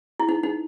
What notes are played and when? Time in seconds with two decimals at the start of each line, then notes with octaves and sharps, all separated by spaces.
0.20 E4
0.29 D#4
0.43 D#4